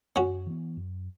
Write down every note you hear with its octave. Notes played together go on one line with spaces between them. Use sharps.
F#2 C#4 F#4
E3 B3
F#2